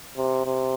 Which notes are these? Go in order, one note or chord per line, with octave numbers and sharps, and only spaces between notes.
C3
C3